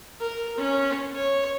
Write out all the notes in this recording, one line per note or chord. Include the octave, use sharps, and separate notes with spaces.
A#4
C#4
C#5